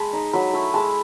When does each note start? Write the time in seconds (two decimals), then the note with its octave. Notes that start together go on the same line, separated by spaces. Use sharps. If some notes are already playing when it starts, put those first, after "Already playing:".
Already playing: G#3 A5 B5
0.13 D#4
0.33 F#3 B5
0.53 A3 E4
0.74 G#3 A5